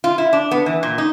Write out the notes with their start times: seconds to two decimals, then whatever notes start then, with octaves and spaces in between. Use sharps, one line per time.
0.04 F4
0.18 E4
0.33 D4
0.51 B3
0.66 E3
0.83 A#2
0.98 D#4